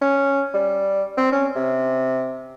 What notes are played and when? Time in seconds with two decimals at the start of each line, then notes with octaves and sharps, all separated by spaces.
0.01 C#4
0.54 G3
1.17 C4
1.32 C#4
1.56 C3